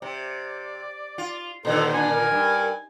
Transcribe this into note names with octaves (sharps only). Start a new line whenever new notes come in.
C3 D5
F4
A#2 D3 D#3 A4 C5
D4 G#5
A#4
G2